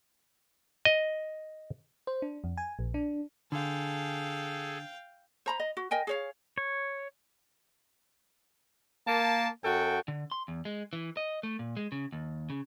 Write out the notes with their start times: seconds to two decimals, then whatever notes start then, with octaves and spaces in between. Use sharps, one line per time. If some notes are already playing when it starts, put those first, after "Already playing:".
0.85 D#5
2.07 C5
2.22 D4
2.44 F2
2.57 G#5
2.79 A#1
2.94 D4
3.52 D3 G#4 A4 F5 G5
5.46 C5 A#5 B5
5.60 D#5
5.77 F#4
5.91 A#4 D#5 G5 G#5
6.07 G#4 C#5 F5
6.58 C#5
9.07 A#3 A5
9.65 F#2 F#4 A4 G5
10.08 D3
10.32 C6
10.48 E2
10.65 G#3
10.93 E3
11.17 D#5
11.43 A3
11.59 A#2
11.77 G#3
11.92 C#3
12.12 D#2
12.50 C#3